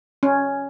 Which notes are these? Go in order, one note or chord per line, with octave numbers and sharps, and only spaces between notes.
C#4